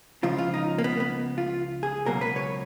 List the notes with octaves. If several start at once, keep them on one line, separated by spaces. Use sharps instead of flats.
C#2 C#3 F3 F4
F4
D#4
A#3
B3
B3
F4
G#4
C#2 B2 F#3 A#3 A#4
B4
C#5